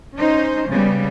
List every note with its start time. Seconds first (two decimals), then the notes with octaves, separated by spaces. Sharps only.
0.16 C#4 D#4 C5
0.69 C#3 G3 B3